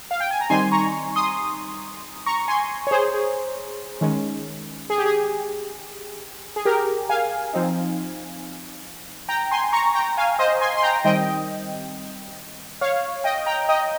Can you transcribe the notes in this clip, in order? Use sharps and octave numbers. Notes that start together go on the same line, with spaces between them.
F5
G5
G#5
A#5
D#3 G3 C4 D#4 G#5 C6
A#5 C#6
C6 D#6
A#5 C#6
G#5 C6
C#5
G#4 C5
G#4
D#3 G#3 C#4
G#4
G4
G#4
G#4
G4 A#4
F5 G#5
F3 C4 D#4
G5 A#5
G#5 C6
A#5 C#6
G5 A#5
F5 G#5
C5 D#5
G#5 C6
C6
G5 A#5
D#3 G3 C4 D#5 G5
C#5 F5
D#5 G5
G5 A#5
D#5 G5